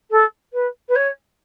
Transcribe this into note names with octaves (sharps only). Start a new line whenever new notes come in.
A4
B4
B4
C#5